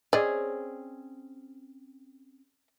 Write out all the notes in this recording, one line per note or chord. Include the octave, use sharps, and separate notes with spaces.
C4 C#4 G#4 D5 D#5